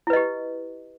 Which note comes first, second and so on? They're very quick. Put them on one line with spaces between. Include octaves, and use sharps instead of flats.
E4 B4 D#5 G4